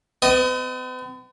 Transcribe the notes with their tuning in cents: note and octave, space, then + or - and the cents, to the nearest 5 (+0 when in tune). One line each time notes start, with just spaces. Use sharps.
B3 +45 D#5 +0